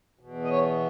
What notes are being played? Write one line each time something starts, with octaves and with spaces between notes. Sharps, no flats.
E2 B2
D#5
C#5